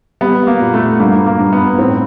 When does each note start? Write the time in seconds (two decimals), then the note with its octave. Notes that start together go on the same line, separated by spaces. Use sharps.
0.21 G3 B3
0.47 A#3
0.60 A#2
0.74 A3
0.99 G2 A#3
1.26 A#3
1.39 G2
1.53 B3
1.79 A2 C4